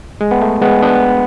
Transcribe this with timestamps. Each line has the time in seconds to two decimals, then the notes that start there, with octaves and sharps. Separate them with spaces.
0.21 G#3
0.31 B3
0.41 A3
0.62 G#3 B3
0.82 B3 D4